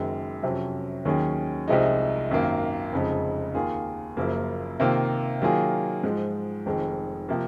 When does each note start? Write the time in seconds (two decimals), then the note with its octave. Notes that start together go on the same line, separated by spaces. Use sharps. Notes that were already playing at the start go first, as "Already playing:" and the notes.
Already playing: F#1 F#2 D#3 G#3
0.43 F2 C3 F#3 C#4
1.05 D#2 D#3 F#3 C#4 G#4
1.68 C2 C3 F3 G#3 D#4
2.30 G#1 F#2 D#3 A#3
2.92 F1 F2 C#3 G#3 D#4
3.54 D#2 D#3 A#3 F4 G#4
4.17 F#1 F#2 C#3 F3 A#3
4.80 C3 D#3 A#3 F4
5.42 D#3 F#3 A#3 F4 G#4
6.03 G#2 F3 G#3
6.66 F1 F2 D#3 G#3
7.29 C3 F3 A#3